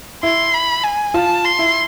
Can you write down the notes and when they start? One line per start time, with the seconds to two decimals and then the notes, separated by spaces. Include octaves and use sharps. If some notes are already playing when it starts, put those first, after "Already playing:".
0.23 E4 C6
0.54 B5
0.84 G#5
1.14 F4 A5
1.45 C6
1.59 E4